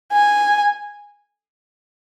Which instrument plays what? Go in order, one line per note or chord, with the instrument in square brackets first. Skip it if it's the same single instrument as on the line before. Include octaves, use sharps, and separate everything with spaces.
[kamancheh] G#5